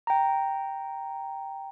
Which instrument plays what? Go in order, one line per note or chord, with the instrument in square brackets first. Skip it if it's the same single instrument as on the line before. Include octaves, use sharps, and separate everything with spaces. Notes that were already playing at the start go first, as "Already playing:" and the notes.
[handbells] G5 A#5